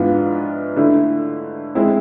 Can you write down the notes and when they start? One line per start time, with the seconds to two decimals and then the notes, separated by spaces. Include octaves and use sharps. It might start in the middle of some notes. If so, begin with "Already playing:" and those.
Already playing: G#2 E3 B3 D4 F4
0.76 D3 A3 E4
1.75 G#3 C4 E4